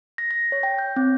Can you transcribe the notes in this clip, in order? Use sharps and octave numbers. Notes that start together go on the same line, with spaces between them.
A#6
A#6
C#5
G5
G6
C4